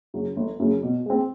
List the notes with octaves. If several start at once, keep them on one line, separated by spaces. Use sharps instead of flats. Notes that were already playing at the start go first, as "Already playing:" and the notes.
F#2 C#3 F#3
G1
F#2 C#3 F#3
B2
G#3 C4